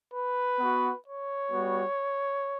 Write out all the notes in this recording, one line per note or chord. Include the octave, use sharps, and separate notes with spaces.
B4
B3 F#4
C#5
G3 B3 F#4